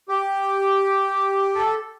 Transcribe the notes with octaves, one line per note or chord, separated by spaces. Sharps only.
G4
A4